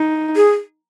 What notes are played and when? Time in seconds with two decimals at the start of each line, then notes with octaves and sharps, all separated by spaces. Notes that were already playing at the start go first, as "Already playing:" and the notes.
Already playing: D#4
0.36 G#4